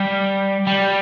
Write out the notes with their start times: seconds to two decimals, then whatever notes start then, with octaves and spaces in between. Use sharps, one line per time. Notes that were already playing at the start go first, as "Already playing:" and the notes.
Already playing: G3
0.67 G3